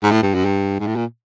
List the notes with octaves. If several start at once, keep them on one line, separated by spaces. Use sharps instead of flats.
G#2
A2
G2
F#2
G2
G#2
A2
A#2